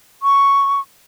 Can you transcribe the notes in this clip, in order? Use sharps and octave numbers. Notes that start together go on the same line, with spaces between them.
C#6